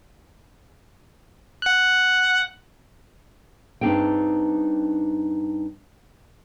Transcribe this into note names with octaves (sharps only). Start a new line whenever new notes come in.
F#5 F#6
G2 C4 D4 D#4 G#4 G5